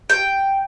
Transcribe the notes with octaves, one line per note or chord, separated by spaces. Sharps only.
G5